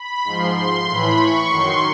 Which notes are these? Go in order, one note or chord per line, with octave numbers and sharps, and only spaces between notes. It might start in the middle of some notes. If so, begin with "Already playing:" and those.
Already playing: B5
G#2 F3 C6
C6
A2 E3 B5
C#6
F#2 D#3 F#3 C6